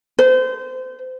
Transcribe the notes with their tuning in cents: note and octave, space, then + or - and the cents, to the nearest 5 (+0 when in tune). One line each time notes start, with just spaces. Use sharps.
C5 -30